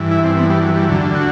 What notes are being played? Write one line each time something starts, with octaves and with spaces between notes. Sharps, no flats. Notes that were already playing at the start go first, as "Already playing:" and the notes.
Already playing: G2 E3
E4
C4
B3
G3
F#3
G3
D2 D3 F#3
F#4